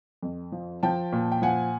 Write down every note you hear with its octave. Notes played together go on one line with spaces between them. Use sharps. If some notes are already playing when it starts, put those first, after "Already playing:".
F2
F3
F3 G5 A5
A#2
G5
F3 F#5 G#5